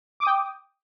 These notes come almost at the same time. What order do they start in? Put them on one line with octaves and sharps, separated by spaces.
D6 D#6 G5